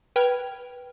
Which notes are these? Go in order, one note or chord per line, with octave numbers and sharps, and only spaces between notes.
B4 G5 F6 G#6